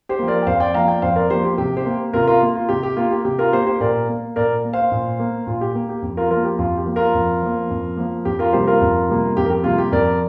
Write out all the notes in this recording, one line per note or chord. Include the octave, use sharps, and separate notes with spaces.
G4 C5
F3 A#3
A#4 D5
G5
F2 C5 F5
D5 G5
F3 A#3 F5 A#5
D5 G5
F2 C5 F5
A#4 D5
F3 A#3 G4 C5
G4
C3 G4
G4 C5
A#3
C3 F4 A#4
F4 A#4
A#3
F4
C3 G4
G4
A#3 F4
G4
C3 G4
F4 A#4
A#3 G4 C5
G4 C5
A#2 A#4 D5
A#3
A#2 A#4 D5
A#3
C5 F5
A#2
A#3
A#2 F4
G4
A#3
G4
F2
F4 A#4
F3 A#3 F4 A#4
G4
F2 F4
G4
F3 A#3
F4 A#4
F2
F3 A#3
F2
F3 A#3
F2 G4
F4 A#4
C3 G3 A#3 G4 C5
F4 A#4
F2
C3 G3 A#3
F2 G4
A#4
G4
C3 G3 A#3 F4
G4
F2 A#4 D5